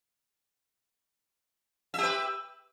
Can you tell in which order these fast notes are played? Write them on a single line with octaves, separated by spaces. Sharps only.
E5 G4 B4